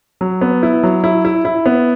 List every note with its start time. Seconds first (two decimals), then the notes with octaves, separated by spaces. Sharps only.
0.21 F#3
0.41 B3
0.63 E4
0.83 F#3
1.04 E4
1.25 E4
1.45 E4
1.66 B3